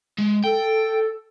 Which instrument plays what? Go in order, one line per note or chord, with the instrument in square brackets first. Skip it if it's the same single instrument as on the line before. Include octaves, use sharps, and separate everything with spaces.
[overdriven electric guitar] G#3
[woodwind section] A4 [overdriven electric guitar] G5